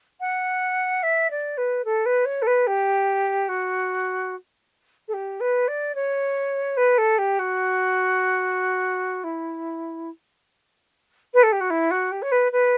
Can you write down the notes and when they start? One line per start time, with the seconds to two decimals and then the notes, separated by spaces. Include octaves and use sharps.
0.20 F#5
1.03 E5
1.30 D5
1.57 B4
1.84 A4
2.06 B4
2.25 C#5
2.42 A4
2.47 B4
2.67 G4
3.49 F#4
5.08 A4
5.13 G4
5.40 B4
5.68 D5
5.95 C#5
6.77 B4
6.98 A4
7.18 G4
7.39 F#4
9.24 E4
11.34 B4
11.43 A4
11.52 G4
11.60 F#4
11.70 E4
11.91 F#4
12.11 G4
12.22 C#5
12.32 B4
12.52 B4